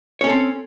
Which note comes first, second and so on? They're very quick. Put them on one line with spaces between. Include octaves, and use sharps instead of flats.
C#5 C#4 A4 C4